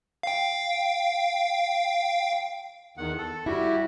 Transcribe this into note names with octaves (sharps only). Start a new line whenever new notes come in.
F5 G5
E2 D#3 F#5
A4
G3 E4 F#4 G4